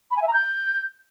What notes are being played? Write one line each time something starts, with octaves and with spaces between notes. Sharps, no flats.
B5
G#5
E5
A#5
G6